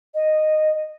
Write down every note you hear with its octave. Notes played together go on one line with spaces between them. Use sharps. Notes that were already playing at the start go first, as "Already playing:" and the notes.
D#5